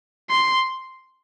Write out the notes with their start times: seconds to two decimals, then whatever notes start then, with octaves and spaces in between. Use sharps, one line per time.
0.30 C6